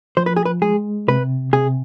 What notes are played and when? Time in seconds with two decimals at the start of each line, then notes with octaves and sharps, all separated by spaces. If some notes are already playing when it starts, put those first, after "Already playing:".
0.17 F3 C5
0.26 B4
0.36 G#4
0.45 B4
0.62 G#3 G#4
1.08 C3 B4
1.53 C3 G#4